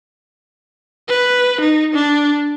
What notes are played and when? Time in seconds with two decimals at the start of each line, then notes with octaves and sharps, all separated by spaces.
1.09 B4
1.62 D#4
1.95 D4